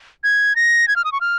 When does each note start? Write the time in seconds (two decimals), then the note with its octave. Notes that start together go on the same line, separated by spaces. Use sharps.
0.24 G#6
0.56 A#6
0.88 G#6
0.96 F6
1.04 D#6
1.12 C#6
1.21 F6